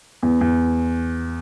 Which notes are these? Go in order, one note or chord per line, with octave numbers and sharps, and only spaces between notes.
E2
E2